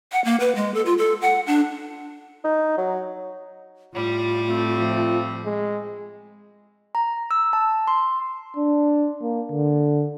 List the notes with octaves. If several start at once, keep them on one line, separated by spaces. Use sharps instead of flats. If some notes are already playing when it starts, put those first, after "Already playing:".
F#5
A#3
B4
G#3
A4
F4
A4
F#5
D4
D#4
F#3
A2 G3 F4
A3 C4
F3
G#3
A#5
E6
A5
C6
D4
A#3
D3